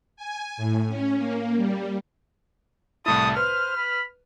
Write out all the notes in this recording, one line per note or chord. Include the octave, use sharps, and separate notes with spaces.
G#5
A2
C#4
A#3
G3
C2 A2 E4 A5 D#6
B4 C5 F6
B5